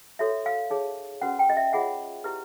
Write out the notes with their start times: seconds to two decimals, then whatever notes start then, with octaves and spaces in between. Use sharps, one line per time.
0.19 F#4 A4 C#5 E5
0.46 F5
0.70 D#4 G#4 C#5
1.21 C#4 F#4 B4 F#5
1.39 G5
1.50 D#5
1.57 E5
1.73 F4 G#4 C#5 F#5
2.24 E4 G4 B4